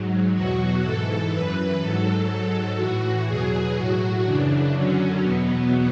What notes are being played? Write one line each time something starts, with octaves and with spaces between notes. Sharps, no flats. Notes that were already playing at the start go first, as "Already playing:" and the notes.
Already playing: G#2 F#3
E2 B2 F#3 F#4
G#2 E3 A4
F#2 E3 B4
G#2 F#3 A4
G#2 F#3
A2 E3 F#4
E2 B2 F#3 G#4
A2 F#3 F#4
F#2 C#3 E3 D4
F#2 D3 F#3 C#4
E2 B2 F#3 B3